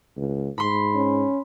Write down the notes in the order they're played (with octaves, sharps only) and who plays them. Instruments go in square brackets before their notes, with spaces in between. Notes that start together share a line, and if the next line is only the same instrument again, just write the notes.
[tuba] C#2
[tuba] G#2 [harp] B5 C6
[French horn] C#4